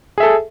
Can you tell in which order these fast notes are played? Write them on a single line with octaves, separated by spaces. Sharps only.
G#4 E5 A4